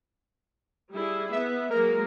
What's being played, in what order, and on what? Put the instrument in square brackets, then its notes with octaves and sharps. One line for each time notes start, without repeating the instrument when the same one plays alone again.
[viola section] G3 E4 G#4
[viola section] B3 [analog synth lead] E5
[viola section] F#3 G#3 A#3 [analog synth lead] A#4